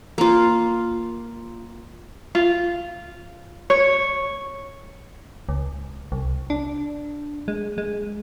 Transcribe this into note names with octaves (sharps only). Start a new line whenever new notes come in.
A#3 F4
F4
C#5
C#2
C2
D4
G#3
G#3